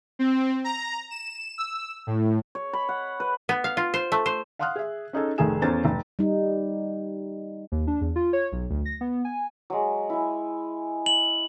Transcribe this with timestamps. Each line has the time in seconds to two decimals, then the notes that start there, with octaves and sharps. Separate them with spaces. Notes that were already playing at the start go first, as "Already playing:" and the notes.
0.19 C4
0.64 A#5
1.11 E7
1.58 E6
2.07 A2
2.55 C#5
2.73 B5
2.89 F#5
3.20 B4
3.49 B3
3.64 F5
3.77 F4
3.94 C5
4.12 A3
4.26 C5
4.59 F5 F#5 C6 D#6 F6 F#6
4.76 G#4 E5
5.13 C#4 D#4 G#4 A4
5.38 F1 D#3 A3 G#4 G#5 E7
5.62 E2 C#4 A4 C5 A#5 A6
5.85 F1
6.19 G3 D#4
7.72 D#2
7.87 D4
8.01 E2
8.16 F4
8.33 C#5
8.52 B1
8.70 D2
8.85 A#6
9.01 B3
9.25 G#5
9.70 F#3 G#3
10.10 E4 G#5
11.06 F#7